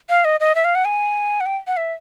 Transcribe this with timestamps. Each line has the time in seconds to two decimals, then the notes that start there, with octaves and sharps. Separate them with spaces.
0.09 F5
0.25 D#5
0.40 D#5
0.55 E5
0.65 F5
0.75 F#5
0.85 G#5
1.40 F#5
1.46 G5
1.67 F#5
1.77 E5